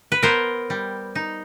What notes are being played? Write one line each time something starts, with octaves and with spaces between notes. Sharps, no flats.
B4
B3 A#4 C5
G3
D#4